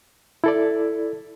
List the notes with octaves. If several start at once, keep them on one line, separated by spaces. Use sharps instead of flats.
E4 A4 D5